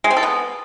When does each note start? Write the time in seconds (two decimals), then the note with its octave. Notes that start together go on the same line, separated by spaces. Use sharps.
0.04 G#3
0.10 C4
0.17 A4
0.23 B3